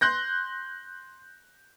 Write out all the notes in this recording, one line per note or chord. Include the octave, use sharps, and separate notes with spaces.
C6 F#6 G6 A#6